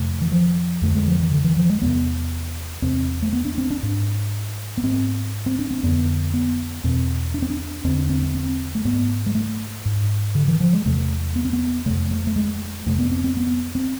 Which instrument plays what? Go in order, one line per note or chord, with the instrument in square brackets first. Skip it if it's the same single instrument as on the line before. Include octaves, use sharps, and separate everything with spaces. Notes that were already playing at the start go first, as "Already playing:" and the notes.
Already playing: [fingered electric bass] F2 C3 A3
E3
F3
F2 D3 A3
G#3
F3
E3
D3
E3
F3
G#3
E2 C3 B3
E2 C3 C4
A3
B3
D4
C4
D4
G#2
B3
G#2 C4
C4
D4
C4
F2 D3 B3
B3
E2 B2 C4
D4
C4
D4
E2 D3 C4
D4
C4
C4
C4
A3
G#2 B3
G#3
A3
G#2
D3
E3
F3
G#3
E2 C3 A3
B3
C4
B3
F2 C3 A3
A3
A3
G#3
F2 C3 A3
B3
C4
C4
B3
C4